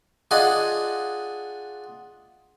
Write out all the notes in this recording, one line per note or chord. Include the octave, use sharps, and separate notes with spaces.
D4 F4 G#4 D#5 F#5